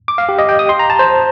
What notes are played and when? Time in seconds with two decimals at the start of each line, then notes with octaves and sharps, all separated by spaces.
0.08 D6
0.18 F5
0.29 G4
0.39 D#5
0.49 G5
0.59 D#6
0.69 C6
0.79 A#5
0.90 A5
0.99 C5